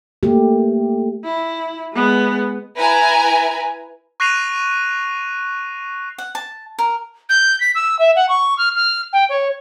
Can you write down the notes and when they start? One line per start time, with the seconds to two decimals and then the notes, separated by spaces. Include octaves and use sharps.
0.23 A3 A#3 G4
1.24 E4
1.93 G#3 B3
2.77 E4 B4 G#5 A#5
4.20 C#6 F#6 A#6 C7 D#7 F7
6.18 F#5
6.35 A5
6.79 A#4
7.29 G6
7.60 B6
7.75 E6
7.99 E5
8.16 F#5
8.29 C#6
8.58 F6
8.76 F6
9.13 G5
9.29 C#5